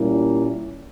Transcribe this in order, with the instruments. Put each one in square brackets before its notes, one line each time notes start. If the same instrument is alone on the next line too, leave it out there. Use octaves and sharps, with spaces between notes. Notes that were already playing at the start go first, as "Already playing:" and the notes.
Already playing: [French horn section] A#2 G3 A#3 C#4 E4